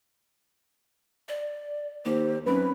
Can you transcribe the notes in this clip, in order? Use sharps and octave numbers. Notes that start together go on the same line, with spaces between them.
D5
D#2 G4 C5
F#2 C4 C#4 B4